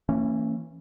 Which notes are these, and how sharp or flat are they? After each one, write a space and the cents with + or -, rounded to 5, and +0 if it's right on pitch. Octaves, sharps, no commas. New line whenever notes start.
E3 +0 A#3 -40 C#4 -15